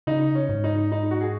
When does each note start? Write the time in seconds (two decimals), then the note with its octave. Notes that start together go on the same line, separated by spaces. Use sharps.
0.07 C#3 D#4
0.35 C#4
0.49 G#2
0.64 D#4
0.92 D#4
1.11 F#4
1.21 G#4